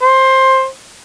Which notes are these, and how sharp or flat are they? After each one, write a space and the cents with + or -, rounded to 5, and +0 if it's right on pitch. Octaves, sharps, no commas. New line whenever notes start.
C5 +15